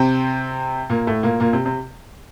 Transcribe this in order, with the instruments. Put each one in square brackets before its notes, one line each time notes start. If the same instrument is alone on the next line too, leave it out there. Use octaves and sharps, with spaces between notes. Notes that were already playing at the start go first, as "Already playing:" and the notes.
Already playing: [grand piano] C3 C4
A#2 A#3
A2 A3
A#2 A#3
A#2 A#3
C3
C3